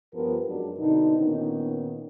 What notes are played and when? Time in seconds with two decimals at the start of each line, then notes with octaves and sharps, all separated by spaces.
0.14 G2 F3 B3 G4 A#4
0.47 F#2 F#3 G#3 D4
0.79 B2 D3 C4 D#4
1.18 A#2 D#3 A#3 B3 C#4 D#4